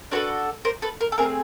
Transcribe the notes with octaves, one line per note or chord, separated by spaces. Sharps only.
D4 F#4 A4 B4 C#5
A#4 C5
A4 B4
A#4
A4
A3 C4 G#4 A#4